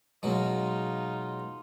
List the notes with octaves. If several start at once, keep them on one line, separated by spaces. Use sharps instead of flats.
B2 F#3 G#3 D#4 F4